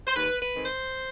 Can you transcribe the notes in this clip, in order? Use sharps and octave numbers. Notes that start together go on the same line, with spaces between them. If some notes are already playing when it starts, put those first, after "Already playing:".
C5
D#2 B4
B4
D#3 G#3 C4
C5